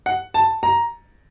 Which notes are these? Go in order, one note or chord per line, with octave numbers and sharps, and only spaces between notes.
F#5
A5
A#5